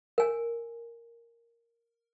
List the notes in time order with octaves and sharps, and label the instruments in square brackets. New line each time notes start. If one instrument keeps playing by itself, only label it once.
[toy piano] A#4 G#5